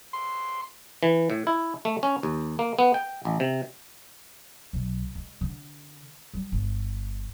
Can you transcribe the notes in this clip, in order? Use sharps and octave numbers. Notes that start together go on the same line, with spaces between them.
C6
E3
A2
E4
A3
C#4
D#2
A#3
B3
G5
A1
C3
B1
G#3
D3
G3
G1